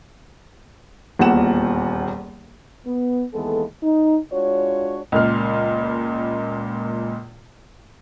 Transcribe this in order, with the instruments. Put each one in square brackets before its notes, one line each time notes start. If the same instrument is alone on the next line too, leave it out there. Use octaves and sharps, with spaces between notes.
[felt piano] D#1 E2 A#2 F#5 E7
[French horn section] B3
D#2 E3 G#3 B3 A4
D#4
G#3 D4 F4 F#4 C#5
[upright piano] C#2 A#2 F6